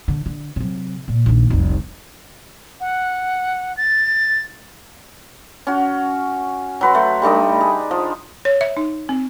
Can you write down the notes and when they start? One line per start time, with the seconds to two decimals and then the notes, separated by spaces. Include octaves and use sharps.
0.08 D3
0.26 D3
0.56 C3 F#3
1.08 A#2
1.26 A#1 D#3
1.50 F1 C2
2.81 F#5
3.77 A6
5.67 C#4 F#4
6.81 F#3 B4 C6
6.95 A3
7.22 G3 A3 D4 D#4
7.61 G#4
7.91 F3
8.45 C#5
8.61 E5
8.77 D#4
9.09 C4